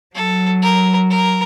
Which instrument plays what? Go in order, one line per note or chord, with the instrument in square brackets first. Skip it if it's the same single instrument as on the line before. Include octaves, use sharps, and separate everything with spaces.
[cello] F#3 [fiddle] A4
[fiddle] A#4
A#4